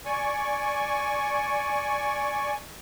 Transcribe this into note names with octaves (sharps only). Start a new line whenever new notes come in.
D5 G#5 C#6